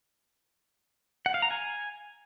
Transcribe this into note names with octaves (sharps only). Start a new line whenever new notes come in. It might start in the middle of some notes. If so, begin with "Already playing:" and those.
F#5
F5
A#5
G#5